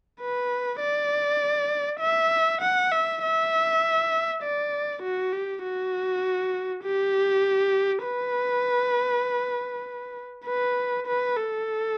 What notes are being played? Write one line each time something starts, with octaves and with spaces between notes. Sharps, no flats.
B4
D5
E5
F#5
E5
E5
D5
F#4
G4
F#4
G4
B4
B4
B4
A4